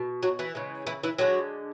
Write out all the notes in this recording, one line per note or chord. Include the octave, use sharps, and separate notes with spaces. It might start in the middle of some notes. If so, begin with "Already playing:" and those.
Already playing: B2
F#3 F#4
E3 E4
C#3 E3 G#3
E3 E4
E3 E4
D3 F#3 G#3 F#4